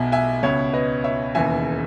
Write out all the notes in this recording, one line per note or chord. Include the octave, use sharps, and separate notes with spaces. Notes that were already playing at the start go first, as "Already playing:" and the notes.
Already playing: B1 B2 E5 G#5
E5 G#5
C#2 B2 C#5 E5
B4 D#5
C#5 E5
E1 D#2 C#3 E3 E5 G#5